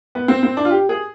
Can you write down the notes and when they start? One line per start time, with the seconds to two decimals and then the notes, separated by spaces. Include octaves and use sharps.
0.15 B3
0.28 C4
0.43 C4
0.57 D4
0.65 F4
0.71 G4
0.89 G#4